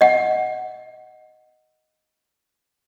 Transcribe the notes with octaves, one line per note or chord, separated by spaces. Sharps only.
D#5 F#5